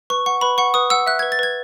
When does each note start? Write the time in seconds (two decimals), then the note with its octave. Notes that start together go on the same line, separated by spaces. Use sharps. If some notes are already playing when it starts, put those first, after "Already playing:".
0.10 B4 C#6
0.26 F#5 C#6
0.41 B4 B5
0.58 F#5 C#6
0.74 B4 D#6
0.90 F#5 E6
1.07 E5 F#6
1.19 G#6
1.23 B4
1.32 A6
1.39 B4 G#6